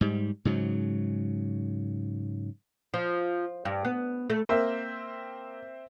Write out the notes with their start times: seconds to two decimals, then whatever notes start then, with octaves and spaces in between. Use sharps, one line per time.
0.01 G#2 G3
0.45 G#2 C#3 F#3
2.94 F3
3.65 G2
3.85 B3
4.30 A3
4.49 A#3 C4 C5 E5